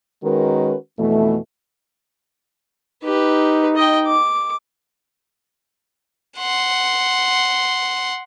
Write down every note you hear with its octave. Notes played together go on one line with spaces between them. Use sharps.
D#3 G#3 C#4 F#4 A#4 B4
F2 B2 E3 A3
D#4 G4 B4
D#5 G5
D6
F#5 C6